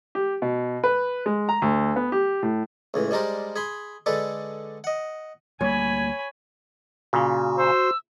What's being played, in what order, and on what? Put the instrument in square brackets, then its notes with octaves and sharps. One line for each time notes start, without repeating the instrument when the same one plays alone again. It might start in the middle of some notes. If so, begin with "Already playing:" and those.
[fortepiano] G4
B2
B4
G#3
A#5
D2
B3
G4
A2
[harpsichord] C#2 A2 E3
G3 G#3 D4 A#4 C5
G#4 B5 C6
D3 G#3 D4 A4 B4
D#5 F#5
[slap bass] D2 G3 A#3 [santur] C#5 [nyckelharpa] G#5 B5
[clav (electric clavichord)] A#2 C#3 [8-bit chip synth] F#4
[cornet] C5 [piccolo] E6